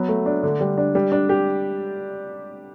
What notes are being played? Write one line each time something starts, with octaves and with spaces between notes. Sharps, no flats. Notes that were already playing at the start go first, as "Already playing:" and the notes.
Already playing: F#3 B3
A3
D4
D3
G3
D4
G3
D4
G4